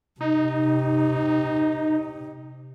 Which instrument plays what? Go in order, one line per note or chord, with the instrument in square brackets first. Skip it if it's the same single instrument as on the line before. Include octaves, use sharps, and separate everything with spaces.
[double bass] C3 [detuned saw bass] D#4